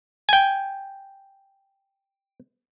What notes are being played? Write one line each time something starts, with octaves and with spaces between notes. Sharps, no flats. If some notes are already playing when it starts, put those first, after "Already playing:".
G5 G#5